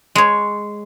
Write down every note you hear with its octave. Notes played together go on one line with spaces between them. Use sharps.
G#3 C#5